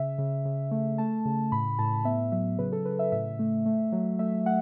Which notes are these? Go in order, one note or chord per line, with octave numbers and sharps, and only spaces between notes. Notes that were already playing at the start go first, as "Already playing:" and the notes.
Already playing: C#3 E5
C#3
C#3
A3
A3 A5
C#3
A2 B5
A2 A5
B3 E5
F#3 E5
C#3 B4
A4
C#3 B4
E5
A2 E5
A3
A3
F#3
A3 E5
A3 F#5